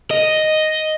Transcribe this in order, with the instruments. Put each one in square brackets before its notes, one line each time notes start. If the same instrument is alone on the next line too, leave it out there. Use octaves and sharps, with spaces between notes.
[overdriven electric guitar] D#5